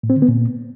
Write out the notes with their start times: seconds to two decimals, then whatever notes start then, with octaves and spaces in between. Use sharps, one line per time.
0.03 A2
0.10 C4
0.16 D3
0.22 B3
0.28 A#2